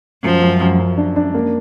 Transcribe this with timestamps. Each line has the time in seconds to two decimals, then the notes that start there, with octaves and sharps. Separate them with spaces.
0.24 F#2 F3
0.42 F#2
0.61 F#2
0.79 F#2
0.97 D4
1.16 D4
1.35 A#3